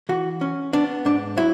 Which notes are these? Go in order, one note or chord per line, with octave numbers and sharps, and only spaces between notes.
E3 F#4
C#4
B3 D4
G#2 D4
F#3 E4